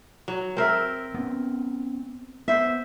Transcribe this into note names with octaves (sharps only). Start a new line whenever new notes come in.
F#3
C4 A#4 E5
B3 C#4
B3 C5 E5